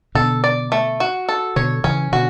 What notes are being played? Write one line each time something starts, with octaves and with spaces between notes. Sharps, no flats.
B2 D3 A4
D5
A3
F#4
A4
B2 D3 C#5
C#3 E3 C#4
B2 D3 F#4